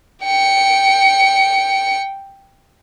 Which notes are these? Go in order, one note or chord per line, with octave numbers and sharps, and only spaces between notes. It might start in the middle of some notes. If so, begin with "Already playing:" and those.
G5 C#7